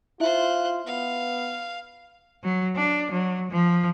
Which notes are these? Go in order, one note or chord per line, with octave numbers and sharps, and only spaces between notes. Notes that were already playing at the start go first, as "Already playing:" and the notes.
E4 F4 C5 E5 F#6
B3 F5
F#3
D4
F#3
F3